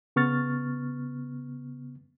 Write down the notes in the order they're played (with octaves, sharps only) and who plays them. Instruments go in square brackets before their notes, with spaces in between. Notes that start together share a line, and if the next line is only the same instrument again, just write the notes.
[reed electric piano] C#3 B3 C#6 F6 A6